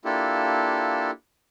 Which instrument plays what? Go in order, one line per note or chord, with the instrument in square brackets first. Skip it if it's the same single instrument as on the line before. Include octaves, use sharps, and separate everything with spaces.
[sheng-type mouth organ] A#3 D4 E4 F4 G4 A4